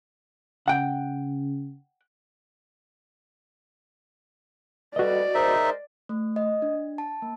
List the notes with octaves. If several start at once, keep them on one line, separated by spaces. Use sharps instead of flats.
C#3 F#5 G5
F2 G3 F#4 B4 D5 D#5
G#3 D#4 A#4 C5 E5
A3
D#5
D4
A5
A#3